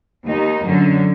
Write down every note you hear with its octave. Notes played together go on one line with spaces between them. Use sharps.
D#2 D#4
F#2 D3 C#4